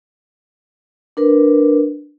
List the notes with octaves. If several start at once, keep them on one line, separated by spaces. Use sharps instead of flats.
D4 A#4 B4